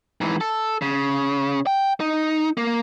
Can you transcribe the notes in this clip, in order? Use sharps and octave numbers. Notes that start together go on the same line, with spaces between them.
G#2 E3
A4
C#3
G5
D#4
A#3